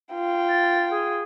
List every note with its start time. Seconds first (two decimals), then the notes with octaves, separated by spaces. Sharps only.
0.14 F4 G5
0.48 A6
0.90 G#4